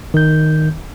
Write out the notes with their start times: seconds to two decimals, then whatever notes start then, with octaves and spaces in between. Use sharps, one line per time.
0.14 D#3 G6